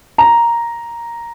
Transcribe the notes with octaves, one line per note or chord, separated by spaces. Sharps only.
A#5